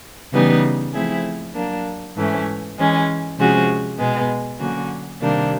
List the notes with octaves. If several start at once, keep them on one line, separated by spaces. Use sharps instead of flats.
C#3 E3 G3 B3 D#4
F3 A3 C4 E4 G#4
F#3 A#3 D4
G#2 E3 A3 C#4
E3 G#3 C#4
C3 F3 G#3 C#4 F#4
B2 G#3 B3
D3 F#3 A#3 C#4 F#4
C3 D#3 G3 A#3 D4